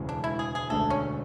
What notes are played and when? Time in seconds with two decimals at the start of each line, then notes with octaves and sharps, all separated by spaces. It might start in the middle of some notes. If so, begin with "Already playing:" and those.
Already playing: E1 D2 C#3 E3 G#3
0.09 D4
0.24 E4
0.39 G#4
0.55 G#4
0.70 E1 D2 D3 A3 A4
0.90 C#4